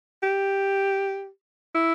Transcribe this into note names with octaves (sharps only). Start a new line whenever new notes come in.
G4
E4